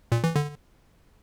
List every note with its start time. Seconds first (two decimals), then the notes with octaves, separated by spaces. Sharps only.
0.12 A#2
0.24 E3
0.36 D3